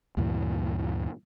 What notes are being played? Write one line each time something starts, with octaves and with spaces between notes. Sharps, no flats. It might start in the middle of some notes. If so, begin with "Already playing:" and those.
D2 G2 A#2 E3